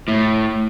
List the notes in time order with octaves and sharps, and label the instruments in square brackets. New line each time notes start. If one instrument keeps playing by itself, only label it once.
[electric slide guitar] A2